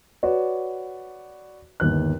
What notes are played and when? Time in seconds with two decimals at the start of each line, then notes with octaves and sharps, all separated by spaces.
0.23 F#4 B4 C#5 D5
1.80 G1 D#2 F#6